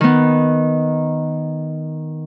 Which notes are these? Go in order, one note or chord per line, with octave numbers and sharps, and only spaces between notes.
D#3 B3